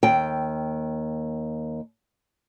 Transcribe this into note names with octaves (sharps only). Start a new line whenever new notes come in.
D#2 G5